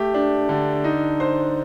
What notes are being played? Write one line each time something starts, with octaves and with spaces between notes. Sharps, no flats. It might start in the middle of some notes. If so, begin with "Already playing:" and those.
Already playing: A3 G4
D4
D3
D#4
C5